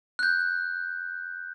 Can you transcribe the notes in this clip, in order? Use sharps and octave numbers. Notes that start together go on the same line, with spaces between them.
F#6 G6